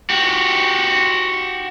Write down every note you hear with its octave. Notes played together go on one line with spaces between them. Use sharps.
F#4 G4